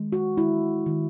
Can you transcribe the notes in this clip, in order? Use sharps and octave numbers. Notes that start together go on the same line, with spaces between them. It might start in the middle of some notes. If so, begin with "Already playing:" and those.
Already playing: D#3 G#3
F#4
D#3 G#3 E4
D#3 G#3